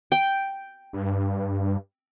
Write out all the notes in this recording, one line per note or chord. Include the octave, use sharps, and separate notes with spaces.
G5
G2